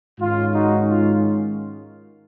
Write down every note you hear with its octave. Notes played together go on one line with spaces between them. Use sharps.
G#2 D#3 G#3 C#4 F4
D#4 F#4
F4